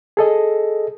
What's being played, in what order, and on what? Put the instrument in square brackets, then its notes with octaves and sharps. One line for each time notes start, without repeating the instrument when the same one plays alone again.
[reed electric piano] G#4 A4 D#5